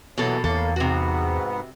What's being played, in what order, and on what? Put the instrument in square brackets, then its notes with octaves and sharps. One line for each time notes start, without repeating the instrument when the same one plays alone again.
[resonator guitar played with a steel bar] B2 A#3 A4 [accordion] E3 F#3
[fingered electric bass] E2 [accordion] A2 A#3 [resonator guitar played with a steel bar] A4
[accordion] G#2 B3 [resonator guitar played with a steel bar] C3 F#4